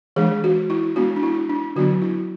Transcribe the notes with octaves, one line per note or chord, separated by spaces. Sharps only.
E3 G#3 D4 G#4
F#4
E4
G#3 B3 D4 F#4
D4
E4
D4
D3 F#3 B3 D4 F#4
E4